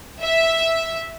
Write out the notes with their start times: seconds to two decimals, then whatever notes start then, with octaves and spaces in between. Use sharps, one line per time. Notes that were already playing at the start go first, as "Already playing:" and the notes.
0.23 E5